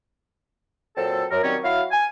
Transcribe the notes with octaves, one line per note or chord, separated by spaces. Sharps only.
A#2 F#3 C4 A4
F#2 A#4
D#3 F#3 G3 C4 C#4 C#5
F#3 E4 F#4 F5
G#5